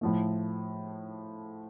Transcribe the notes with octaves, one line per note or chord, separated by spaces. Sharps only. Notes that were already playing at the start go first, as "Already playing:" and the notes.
A2 F3 A3